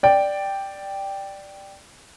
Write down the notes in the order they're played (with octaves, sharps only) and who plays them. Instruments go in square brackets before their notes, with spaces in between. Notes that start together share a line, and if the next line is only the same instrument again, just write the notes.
[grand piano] D5 G5